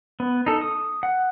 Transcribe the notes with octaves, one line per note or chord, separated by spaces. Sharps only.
B3
D#4 A4
D#6
F#5